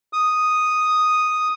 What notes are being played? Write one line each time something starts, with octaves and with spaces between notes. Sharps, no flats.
D#6